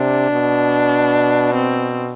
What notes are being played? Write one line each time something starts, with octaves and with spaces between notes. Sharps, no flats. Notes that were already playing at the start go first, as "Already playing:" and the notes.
Already playing: C3 D4
B2
C4